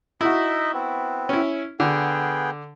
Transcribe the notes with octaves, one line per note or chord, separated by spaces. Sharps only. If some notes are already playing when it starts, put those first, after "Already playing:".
D#4 E4 F#4 D#5 E5
B3 C4
C#4 E4
D3 B3 G#4 G5